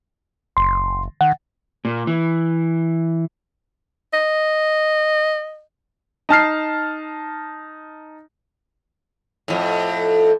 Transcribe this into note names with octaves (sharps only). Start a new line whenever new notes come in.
F#1 C6
D#3 F#5
A#2
E3
D#5
D#4 A5 F6 C7
F2 A2